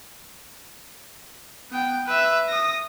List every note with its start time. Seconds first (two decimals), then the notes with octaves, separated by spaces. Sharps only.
1.71 B3 G5
2.07 B4 E5
2.49 D#6 A#6